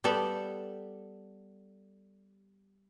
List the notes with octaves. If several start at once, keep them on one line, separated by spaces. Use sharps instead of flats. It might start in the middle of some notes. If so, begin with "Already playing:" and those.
G3 B3 G4 A4 D5